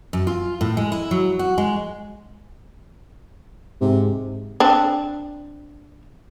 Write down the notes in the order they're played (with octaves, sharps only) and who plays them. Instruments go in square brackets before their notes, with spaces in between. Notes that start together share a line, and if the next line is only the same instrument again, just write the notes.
[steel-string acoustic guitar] F#2
F4
A2
G#3
E4
F#3
F#4
G#3
[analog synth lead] G#2 [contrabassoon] C3
[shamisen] C4 D4